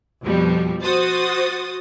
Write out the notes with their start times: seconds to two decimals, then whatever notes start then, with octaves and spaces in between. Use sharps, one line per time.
0.22 F2 B2 F3 G3
0.83 F#4 C5 D#6 A6